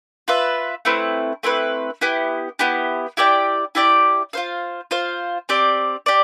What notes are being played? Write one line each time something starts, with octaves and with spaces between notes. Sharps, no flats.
F4 B4 E5
A3 C4 E4 B4
A3 C4 E4 B4
B3 E4 G4
B3 E4 G4
E4 G4 D5 G5
E4 G4 D5 G5
F4 C5 F5
F4 C5 F5
C4 G4 D5
G4 D5